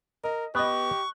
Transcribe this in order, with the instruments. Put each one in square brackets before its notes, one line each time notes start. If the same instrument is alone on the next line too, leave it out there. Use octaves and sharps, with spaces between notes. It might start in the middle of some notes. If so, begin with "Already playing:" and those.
[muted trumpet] A#4 [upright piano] D#5
[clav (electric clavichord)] B3 [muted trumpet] G4 [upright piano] D#5 F#6 [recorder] C#6